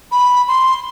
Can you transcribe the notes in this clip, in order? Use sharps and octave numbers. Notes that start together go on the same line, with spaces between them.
B5
C6